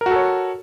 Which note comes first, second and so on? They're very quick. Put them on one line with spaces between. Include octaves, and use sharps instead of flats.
A#4 F#4 A4 C#5